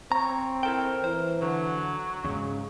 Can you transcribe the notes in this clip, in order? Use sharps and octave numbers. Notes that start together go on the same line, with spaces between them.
C4 C#5 A#5
E4 A4 A#4 G5
E3 C5
D3 F#3
E2 G#2 C#3